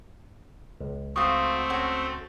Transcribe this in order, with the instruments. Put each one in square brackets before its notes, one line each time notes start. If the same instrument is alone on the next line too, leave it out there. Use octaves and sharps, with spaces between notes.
[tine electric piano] C#2
[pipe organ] A3 C4 [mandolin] F4 F#4 [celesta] C#6 D#6
[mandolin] C#4 F#4 A4